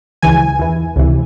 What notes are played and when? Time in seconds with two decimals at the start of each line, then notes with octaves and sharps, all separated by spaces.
0.22 C#2 C#3 E3 G#5
0.59 E2 E3
0.96 C#2 C3 E3